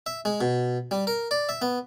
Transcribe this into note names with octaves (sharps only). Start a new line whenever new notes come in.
E5
G#3
B2
G3
A#4
D5
E5
B3